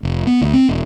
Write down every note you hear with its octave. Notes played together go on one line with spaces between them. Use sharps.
F1
B3
D2
C4
E1